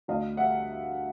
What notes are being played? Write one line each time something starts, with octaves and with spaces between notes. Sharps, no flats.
D2 D#5 F5
G3 E5 F#5